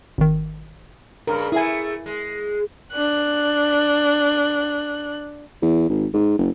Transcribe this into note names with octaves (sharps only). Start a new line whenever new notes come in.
G#1 D#3
G2 C#3 A#4
A3 E4 G#4 G#5
G#3
D4 F#6
E2
G#1
G#2
F#1